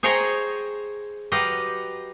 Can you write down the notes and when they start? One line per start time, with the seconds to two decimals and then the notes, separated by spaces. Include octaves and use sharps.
0.03 G#4 C5 C#5 D#5 G5 A#5
1.32 F#3 G4 B4 D#5 F5